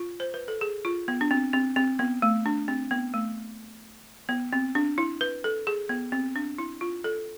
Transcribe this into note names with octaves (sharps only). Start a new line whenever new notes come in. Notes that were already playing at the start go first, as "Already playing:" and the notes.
Already playing: F4
C5
B4
A4
G#4
F4
B3
D4
C4
C4
C4
B3
A3
D4
C4
B3
A3
B3
C4
D4
E4
B4
A4
G#4
B3
C4
D4
E4
F4
A4